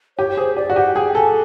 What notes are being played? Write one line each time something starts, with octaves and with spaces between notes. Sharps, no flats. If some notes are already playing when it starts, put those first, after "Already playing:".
G4 C#5
G#4 C5
G4 D5
F#4
G4 F#5
G#4 G5
A4 G#5